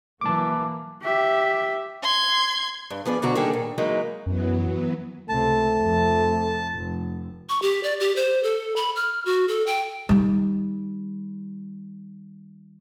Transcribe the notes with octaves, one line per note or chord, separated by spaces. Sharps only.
E3 F#3 A#3 A5 D6
G4 E5
C6 G#6
G2
F3 B3 G#4 D5
D2 B2 D3 F#3 F#4 A#5
D#3 G3 A#3 D4 G#4 A4
A#2
E3 F#3 G#3 A#3 D#4
F#2 E3 F#3 B3
C#2 C3 A3 A5
F1 F2
F1
C#6
G4
D5
G4
C5
A4
B5
F6
F#4
A4
G5
D#3 G3